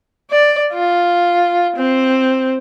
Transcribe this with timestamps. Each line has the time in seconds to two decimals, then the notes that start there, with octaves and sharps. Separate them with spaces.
0.31 D5
0.74 F4
1.76 C4